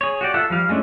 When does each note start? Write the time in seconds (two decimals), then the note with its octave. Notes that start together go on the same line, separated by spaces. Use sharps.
0.01 G#4 C#5
0.21 F#4 G4 D5
0.34 F4 A4 E5 F#5
0.50 F3 G3 F5 F6
0.69 G#3 A3 C#4 D4 E4